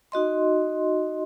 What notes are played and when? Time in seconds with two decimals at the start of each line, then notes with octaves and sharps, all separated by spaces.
0.12 D#4 F#4 D#5 C6